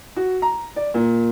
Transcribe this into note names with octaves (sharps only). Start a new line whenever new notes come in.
F#4
A#5
D5
A#2